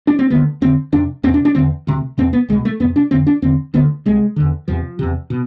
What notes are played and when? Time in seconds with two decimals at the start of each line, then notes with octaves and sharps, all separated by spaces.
0.07 D4
0.19 C4
0.30 D2 D3 B3
0.61 F2 D3 C4
0.92 F2 C3 D4
1.23 E2 C4
1.29 C3
1.34 D4
1.45 D4
1.55 E2 D3 C4
1.87 D2 C3
2.18 E2 C3 C4
2.33 B3
2.49 C2 B2 G#3
2.65 A3
2.80 F2 B3
2.83 C3
2.96 D4
3.11 F2 D3 C4
3.27 D4
3.42 E2 D3 C4
3.74 D2 D3 B3
4.06 C2 C3 G#3
4.36 E2 D3
4.68 E2 C3 F3
4.99 E2 C3
5.30 B2